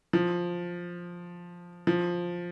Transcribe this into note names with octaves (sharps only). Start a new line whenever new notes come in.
F3
F3